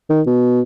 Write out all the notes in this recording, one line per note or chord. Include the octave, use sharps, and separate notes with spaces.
D#3
B2